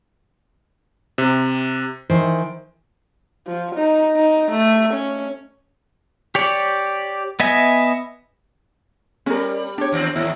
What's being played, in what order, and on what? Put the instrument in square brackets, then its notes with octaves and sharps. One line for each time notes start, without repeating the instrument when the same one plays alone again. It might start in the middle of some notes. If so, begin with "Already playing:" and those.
[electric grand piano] C3
[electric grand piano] D#3 [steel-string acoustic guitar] E3 C5
[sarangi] F3
D#4
D#4
A3
C#4
[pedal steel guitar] G4 C#5 D5
B3 D#5 E5 G#5
[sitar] G3 [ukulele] C#4 A#4
[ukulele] D4 C#5 [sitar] G4
[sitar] D#2 C4
[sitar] D#2 A2 [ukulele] E4